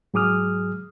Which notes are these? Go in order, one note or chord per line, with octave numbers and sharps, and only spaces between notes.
G#2 F#3 G#4 D6 D#6 F6